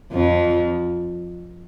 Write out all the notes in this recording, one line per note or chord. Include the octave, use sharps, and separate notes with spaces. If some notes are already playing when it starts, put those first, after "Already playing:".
F2 F3